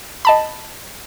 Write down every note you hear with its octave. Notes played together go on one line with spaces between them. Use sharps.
D#5 A5 B5